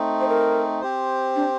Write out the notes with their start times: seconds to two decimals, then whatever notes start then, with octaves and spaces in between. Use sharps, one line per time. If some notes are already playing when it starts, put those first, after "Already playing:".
Already playing: A3 C4 D#4
0.21 C5
0.28 A#4
0.81 C4 G4 C5
1.36 D4